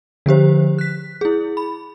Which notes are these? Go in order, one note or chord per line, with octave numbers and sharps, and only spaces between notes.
D3 F3 G4 C5
F#6 B6
E4 G#4
B5